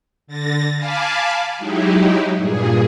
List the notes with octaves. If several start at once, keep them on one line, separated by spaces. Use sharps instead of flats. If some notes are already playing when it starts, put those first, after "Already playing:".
D3 A6 A#6
F5 G#5 A5 B5 D6
F#3 G#3 D#4 E4 G4
G2 A#2 G#4